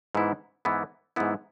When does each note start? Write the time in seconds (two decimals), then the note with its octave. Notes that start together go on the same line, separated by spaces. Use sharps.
0.15 G#2 E3 B3 E4
0.65 G#2 E3 B3 E4
1.16 G#2 E3 B3 E4